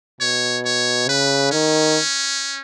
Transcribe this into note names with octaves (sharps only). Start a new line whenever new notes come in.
B2 C#5
C#5
C#3 B4
D#3 C#4